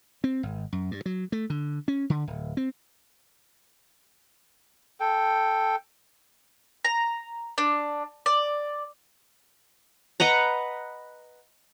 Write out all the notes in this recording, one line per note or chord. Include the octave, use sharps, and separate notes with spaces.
C4
G#1
F#2
G2
F#3
A3
D3
C#4
D3
D1
C4
A4 G5
A#5
D4
D5
B4 D#5 F#5 A#5